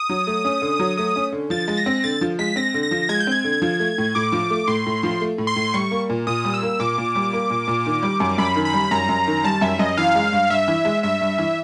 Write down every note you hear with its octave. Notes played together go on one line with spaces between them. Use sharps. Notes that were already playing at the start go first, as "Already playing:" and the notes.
Already playing: D#6
F#3
A3
C#4
D3
F#3
A3 D#6
C#4
D3
F3 A6
G#3
A#6
C4
D3 A6
F3
G#3 B6
C4 A#6
D3
A#6
F3
G#3 G#6
G6
C4 G#6
D3
F3
A3
A2
A2 D6
F3
A3
A2 C6
A2
F3
A3
A2
C6
A2
G3 C#6
A#3
A#2
A#2 D#6
G3
E6
A#3
A#2 D6
A#2
G3
A#3
A#2
A#2
D#3
G3
F#2
F#2 B5
D#3
B5
G3
F#2 A#5
F#2
D#3
G3 A5
F#2 E5
F#2 D#5
E3 F5
G#3
G2
G2 E5
E3
G#3
G2 E5
G2
E3